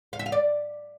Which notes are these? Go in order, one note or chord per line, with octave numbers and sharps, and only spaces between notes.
F5
E5
F5
D5